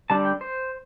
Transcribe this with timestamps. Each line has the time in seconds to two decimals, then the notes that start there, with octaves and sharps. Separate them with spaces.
0.10 D3 G3 D4 A5
0.25 G5
0.41 C5